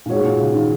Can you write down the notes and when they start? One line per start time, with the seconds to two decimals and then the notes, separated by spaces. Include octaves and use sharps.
0.06 A#2
0.09 G#2 G#3 F#4 C#5
0.24 A#2
0.39 C#3
0.54 D#3